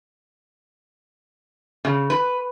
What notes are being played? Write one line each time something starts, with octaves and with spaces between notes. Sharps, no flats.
C#3
B4